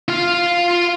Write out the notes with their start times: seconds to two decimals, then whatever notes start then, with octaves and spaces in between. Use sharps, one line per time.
0.08 F4 F5